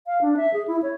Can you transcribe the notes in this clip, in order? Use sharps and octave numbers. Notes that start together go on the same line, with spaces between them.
F5
D4
E5
G#4
E4
C#5